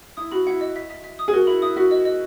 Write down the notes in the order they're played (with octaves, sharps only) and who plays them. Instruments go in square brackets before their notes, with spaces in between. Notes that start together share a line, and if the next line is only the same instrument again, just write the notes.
[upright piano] E4 [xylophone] D#6
[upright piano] F#4 [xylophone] B5
[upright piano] E4 [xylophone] F#5
[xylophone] D#5
E5
E5
E5
D#6
[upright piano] G#4
[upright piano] F#4 [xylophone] A#4
[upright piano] E4 [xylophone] B5
[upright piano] E4 [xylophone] D#6
[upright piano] F#4 [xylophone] E5
[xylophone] D#5
D#5